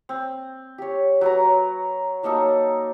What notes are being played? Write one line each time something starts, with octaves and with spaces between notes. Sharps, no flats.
C4
G4 C#5
F#3 B4 A#5
F#3 A#3 D#4 A4